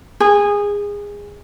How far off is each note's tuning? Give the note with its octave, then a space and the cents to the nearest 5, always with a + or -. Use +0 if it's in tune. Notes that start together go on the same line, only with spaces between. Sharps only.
G#4 -20